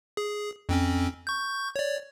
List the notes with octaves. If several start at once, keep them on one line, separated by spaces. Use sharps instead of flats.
G#4
F2 C4 C#4
C#6 G6
C#5 D5